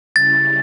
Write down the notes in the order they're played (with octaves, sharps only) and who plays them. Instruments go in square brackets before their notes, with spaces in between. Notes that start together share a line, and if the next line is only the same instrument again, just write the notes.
[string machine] C#3 G3 C#4 E4 [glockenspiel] A6